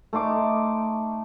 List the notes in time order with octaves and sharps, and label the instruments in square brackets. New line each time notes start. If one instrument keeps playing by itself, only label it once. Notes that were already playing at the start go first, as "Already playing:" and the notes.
[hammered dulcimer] A3 D#4 C6 D6